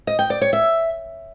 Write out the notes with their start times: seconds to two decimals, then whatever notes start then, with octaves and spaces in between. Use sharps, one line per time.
0.07 D#5
0.19 G5
0.30 D5
0.41 C#5
0.53 E5